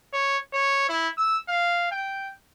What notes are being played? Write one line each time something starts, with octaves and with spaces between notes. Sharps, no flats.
C#5
C#5
E4
E6
F5
G5